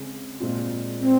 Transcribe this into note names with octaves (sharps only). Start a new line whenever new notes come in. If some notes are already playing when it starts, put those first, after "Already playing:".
Already playing: C#3 G#3 C4
A#2 G#3 C4 F4
C4